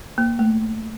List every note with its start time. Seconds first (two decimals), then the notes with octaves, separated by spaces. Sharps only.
0.18 A#3
0.39 A3